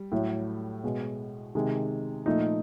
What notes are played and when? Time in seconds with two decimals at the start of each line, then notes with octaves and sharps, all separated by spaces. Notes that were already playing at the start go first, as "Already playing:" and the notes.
Already playing: G3
0.12 A2 F#3 A3
0.84 B2 G#3
1.55 C3 D#3 G#3
2.26 A#2 F3 A3 D#4